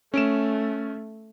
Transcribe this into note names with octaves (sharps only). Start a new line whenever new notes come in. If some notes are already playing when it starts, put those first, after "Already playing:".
A3 C#4 D7 E7